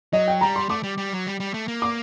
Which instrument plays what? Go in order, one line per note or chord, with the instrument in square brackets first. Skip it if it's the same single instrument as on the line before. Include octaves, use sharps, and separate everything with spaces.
[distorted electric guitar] F#3 [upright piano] D#5
[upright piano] G5
[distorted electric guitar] G3 [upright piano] A#5
[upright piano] C6
[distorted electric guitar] A3 [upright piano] D6
[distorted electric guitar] G3
G3
F#3
G3
G3
A3
A#3
[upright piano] D6